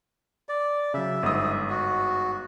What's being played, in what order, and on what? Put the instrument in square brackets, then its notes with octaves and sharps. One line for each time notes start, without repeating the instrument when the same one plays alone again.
[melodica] D5
[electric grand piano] C#3 F#3 [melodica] E5
[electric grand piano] G1 G#2 D#6
[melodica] F#4